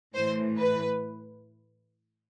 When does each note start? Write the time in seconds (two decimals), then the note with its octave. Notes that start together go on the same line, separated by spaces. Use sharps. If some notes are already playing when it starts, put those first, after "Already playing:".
0.14 A2 E3 C5
0.59 B4